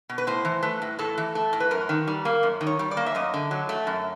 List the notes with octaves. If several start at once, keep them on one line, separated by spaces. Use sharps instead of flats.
B2
B4
A2 C5
E3
A3 B4
A2
A2 A4
E3
A3
A2
B4
F#2 A#4
D#3
G3
A#3
F#2
D#3
C#5
G3
D5
A#3
E5
F#2 D#5
D3
F#3
A3
F#2